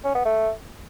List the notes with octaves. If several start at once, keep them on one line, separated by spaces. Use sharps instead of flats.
C#4
B3
A3